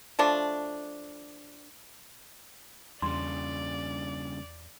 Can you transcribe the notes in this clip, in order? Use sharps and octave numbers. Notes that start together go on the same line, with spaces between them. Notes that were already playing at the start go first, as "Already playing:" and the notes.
F3 A3 D4
E2 G2 C#3 D5 C6